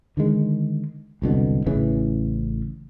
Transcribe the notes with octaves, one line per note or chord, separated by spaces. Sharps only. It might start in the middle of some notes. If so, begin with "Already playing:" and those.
D3 D#3 G#3
E1 C2 B2 D3
A1 C#3 E3